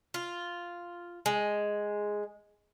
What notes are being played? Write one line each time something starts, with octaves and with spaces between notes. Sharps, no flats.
F4
G#3